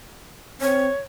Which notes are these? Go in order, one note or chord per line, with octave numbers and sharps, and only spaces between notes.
C4 C#5